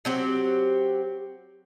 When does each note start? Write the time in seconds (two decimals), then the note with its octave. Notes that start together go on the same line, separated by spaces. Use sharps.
0.05 F#3 C4 G4